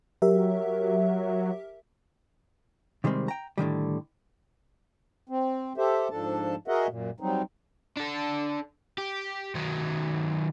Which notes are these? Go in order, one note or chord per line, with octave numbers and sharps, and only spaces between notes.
F#3 G4 A#4 E5
C3 D#3 G3 G#3 C4
G5 A#5
A2 D3 D#3 G3
C4
G4 A4 C5 E5
G#2 F3 D4 A4 A5
F#4 G#4 A#4 D#5 E5 F#5
F#2 A#2
F#3 G3 C4 D#4
D4 A4
G4
D#3 F#3